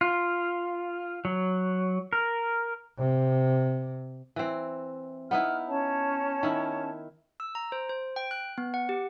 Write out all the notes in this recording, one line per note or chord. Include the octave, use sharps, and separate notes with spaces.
F4
F#3
A#4
C3
E3 C4
B3 D#4 E4 F6
C#4 C#5 A5
D#3 E4
E6
A#5
C5
C5
G5
F#6
B3
F#5
G4